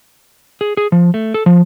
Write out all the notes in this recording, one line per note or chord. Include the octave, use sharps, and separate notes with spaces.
G#4
G#4
F3
A3
A4
F3